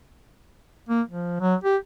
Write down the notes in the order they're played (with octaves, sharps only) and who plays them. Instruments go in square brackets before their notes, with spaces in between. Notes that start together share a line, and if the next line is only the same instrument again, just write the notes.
[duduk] A#3
F3
F#3
G4